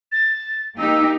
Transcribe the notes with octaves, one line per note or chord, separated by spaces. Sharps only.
A6
A#3 D#4 G4 E6